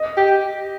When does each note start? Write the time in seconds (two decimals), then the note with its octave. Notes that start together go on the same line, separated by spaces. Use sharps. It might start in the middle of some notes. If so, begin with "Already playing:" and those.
Already playing: D#5
0.17 G4